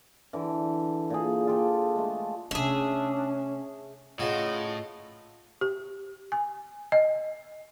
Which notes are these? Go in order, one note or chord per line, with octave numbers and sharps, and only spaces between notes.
D3 E3
A#2 G#4
F4 G4 A4
G#3 A3
C3 A3 C#4 D4 G#4 E5
A2 C#3 F4 F#4 D#5
G4
G#5
D#5